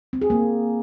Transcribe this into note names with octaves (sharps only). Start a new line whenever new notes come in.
C4
G#4
A#3